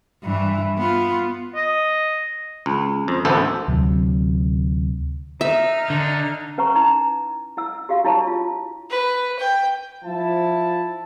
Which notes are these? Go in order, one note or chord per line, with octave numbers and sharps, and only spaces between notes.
G2 E3
B3 F4
D#5
C#2
F2
A1 D2 E3 B3 A4 C5
D2 C3 F#3
D#4 E5 F6
D3
C#4 B4 F#5 A#5 C#6
D#4 E4 A#5
E4 F#5 E6
F#4 G4 F5
D4 E4 G4 C#5 A5 C#6
F4
B4
G5
F3 E4 A5